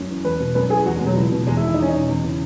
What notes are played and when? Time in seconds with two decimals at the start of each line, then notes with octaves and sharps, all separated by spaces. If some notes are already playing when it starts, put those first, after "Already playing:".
Already playing: F#2
0.09 E3
0.24 E2 B4
0.39 B2
0.55 F#2 B4
0.70 E3 G#4
0.86 E2 F#4
0.96 G#3
1.01 B2
1.06 F#3
1.16 C#2 E3
1.31 B2
1.47 E2 G#3
1.57 E4
1.62 D#3
1.67 E4
1.74 D#4
1.77 E2 C#4
1.89 B2 D#4
2.08 E2
2.23 C#3 E3